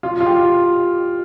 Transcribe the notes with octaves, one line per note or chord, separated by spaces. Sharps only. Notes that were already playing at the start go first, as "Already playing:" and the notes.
F4
F4
G4